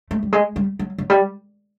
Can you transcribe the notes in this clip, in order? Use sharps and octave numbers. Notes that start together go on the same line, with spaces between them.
A3
G3
G#3
G3
F#3
F#3
G3